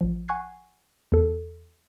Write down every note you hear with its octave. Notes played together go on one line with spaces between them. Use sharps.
A1 F3
F#5 G#5 C#6 F#6 G#6 C7
E2 A4